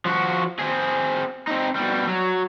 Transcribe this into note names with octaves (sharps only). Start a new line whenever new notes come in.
F3 F#4
C4 G#4
C4 D#4
B2 G3
F#3